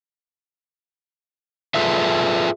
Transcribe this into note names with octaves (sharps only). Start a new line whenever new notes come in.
F4 G#4 A4 B4 E5